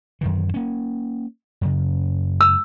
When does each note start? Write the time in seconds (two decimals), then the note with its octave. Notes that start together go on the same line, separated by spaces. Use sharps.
0.21 F#2 D#3 E3
0.54 A#3 C#4
1.61 F#2 C#3
2.41 E6